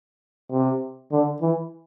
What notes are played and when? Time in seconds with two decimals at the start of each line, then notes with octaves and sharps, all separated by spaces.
0.52 C3
1.12 D3
1.41 E3